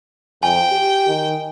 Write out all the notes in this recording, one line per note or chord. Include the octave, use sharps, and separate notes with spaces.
F2 G5 G#5
G4
D#3